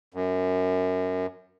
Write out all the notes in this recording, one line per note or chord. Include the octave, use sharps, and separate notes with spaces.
F#2